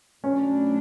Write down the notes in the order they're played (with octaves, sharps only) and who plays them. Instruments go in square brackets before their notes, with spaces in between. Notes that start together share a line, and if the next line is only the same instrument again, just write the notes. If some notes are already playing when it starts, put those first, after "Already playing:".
[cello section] B2 F#3 A3 D4 [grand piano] C#4